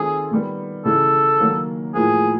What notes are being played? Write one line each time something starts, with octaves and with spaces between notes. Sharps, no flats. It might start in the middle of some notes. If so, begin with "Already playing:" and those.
Already playing: D#3 G#3 C4 F4 G#4 A4
D#3 G3 B3
C#3 E3 G#3 A4
D#3 F#3 A#3
A2 F3 A#3 G#4